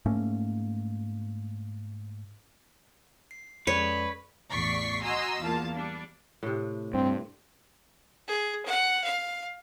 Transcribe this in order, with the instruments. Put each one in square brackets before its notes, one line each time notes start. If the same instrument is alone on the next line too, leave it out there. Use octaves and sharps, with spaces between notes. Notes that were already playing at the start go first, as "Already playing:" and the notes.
[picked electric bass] G#2 A3 A#3 C#4
[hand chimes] C7
[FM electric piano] F2 G#3 [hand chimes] C#4 A4 D5 [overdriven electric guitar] B4 [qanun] C#5
[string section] A1 E2 D5 C#6 B6 C7
F#4 D#5 G#5 A#5 C6 E6
E2 A#3 F4 F5 A5
G3 D4
[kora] A2 C3
[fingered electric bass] G2 [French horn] C4
[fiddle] G#4
F#5
F5